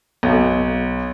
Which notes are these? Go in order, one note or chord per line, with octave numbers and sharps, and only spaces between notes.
B1